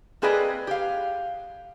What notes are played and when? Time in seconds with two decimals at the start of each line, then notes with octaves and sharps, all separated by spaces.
0.22 A#3 C4 G#4 B4 D5 D#5
0.67 G4 F5